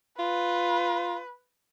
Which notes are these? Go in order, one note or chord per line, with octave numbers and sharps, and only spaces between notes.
F4 B4